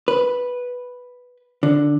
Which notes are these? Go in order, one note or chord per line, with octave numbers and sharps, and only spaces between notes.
B4
D3